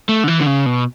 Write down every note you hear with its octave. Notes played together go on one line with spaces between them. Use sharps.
A3
D3
E3
D3
C#3
B2